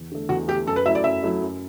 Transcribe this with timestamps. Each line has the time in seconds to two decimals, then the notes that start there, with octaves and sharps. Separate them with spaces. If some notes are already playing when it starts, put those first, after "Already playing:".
Already playing: E2
0.12 D3 A3
0.29 E2 F#4
0.48 D3 A3 G4
0.67 F#2 A4
0.76 B4
0.85 F#3 A3 E4 E5
0.95 D5
1.04 F#2 E5
1.23 F#3 A3 E4
1.42 F#2